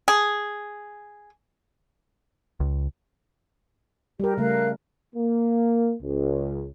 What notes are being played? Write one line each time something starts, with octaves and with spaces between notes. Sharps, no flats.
G#4
C#2
G3 G4 A#4
C#3 G3 A3 A#4 F5 F#6
A#3
C#2